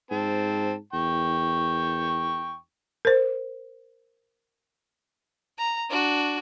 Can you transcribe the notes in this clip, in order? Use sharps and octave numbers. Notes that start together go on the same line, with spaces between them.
G#2 C4 A5
E2 G5 C#6
A#4 C5
A#5
D4 F#4